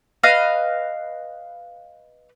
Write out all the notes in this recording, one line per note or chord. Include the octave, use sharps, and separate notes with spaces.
B4 D#5 F5 F6